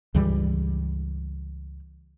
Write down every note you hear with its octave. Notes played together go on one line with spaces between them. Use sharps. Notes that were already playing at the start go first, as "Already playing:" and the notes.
C#2 G2 E3 G3